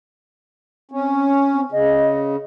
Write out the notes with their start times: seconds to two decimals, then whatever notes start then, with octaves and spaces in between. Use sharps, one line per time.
0.91 C4 C#4
1.53 C4
1.72 C#3 D#5